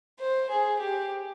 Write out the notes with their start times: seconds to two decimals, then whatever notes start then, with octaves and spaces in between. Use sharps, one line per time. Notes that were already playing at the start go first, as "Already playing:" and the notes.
0.20 C5
0.50 G#4
0.79 G4